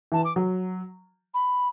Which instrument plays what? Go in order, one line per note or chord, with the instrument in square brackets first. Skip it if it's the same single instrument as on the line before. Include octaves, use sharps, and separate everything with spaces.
[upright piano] E3 [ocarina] A5
[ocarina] D6
[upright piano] F#3
[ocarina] B5